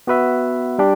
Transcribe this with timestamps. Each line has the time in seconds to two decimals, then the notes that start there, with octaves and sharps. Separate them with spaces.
0.07 B3 F#4 B4 E5
0.79 G3 D4 G4